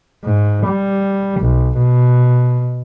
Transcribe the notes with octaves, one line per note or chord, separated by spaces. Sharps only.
G#2
G3
B1
B2